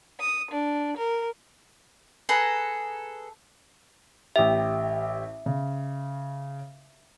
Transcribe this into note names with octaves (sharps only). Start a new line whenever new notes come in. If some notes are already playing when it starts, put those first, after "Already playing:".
D#6
D4
A#4
G#4 A4 B4 A#5
A1 G4 E5
C#3